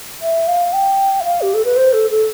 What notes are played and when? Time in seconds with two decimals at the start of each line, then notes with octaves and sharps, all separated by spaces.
0.22 E5
0.47 F5
0.73 G5
1.20 E5
1.25 F5
1.41 G4
1.54 A4
1.65 B4
1.76 C5
1.93 A4
2.10 A4